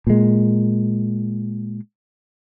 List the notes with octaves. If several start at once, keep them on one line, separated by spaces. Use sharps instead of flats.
A#2 G#3